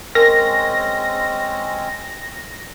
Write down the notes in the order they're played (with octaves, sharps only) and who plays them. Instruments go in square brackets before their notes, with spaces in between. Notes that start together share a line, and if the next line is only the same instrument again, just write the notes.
[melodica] G#3 C4 C#4 [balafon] A#4 [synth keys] A#6